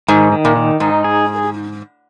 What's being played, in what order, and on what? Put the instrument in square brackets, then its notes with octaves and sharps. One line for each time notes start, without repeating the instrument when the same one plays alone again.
[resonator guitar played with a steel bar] G#2 [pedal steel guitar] D#3
[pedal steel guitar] D#3
[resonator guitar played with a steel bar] A#2
[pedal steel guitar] D#3
[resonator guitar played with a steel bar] G#2 [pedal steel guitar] D#4
[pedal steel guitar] G#4